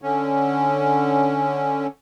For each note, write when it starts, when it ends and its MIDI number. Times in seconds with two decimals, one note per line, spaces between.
0.02 1.87 50
0.02 1.87 61